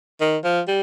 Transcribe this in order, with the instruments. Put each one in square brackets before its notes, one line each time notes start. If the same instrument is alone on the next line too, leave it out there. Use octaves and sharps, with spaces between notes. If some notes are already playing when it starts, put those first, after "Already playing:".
[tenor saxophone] D#3
F3
G3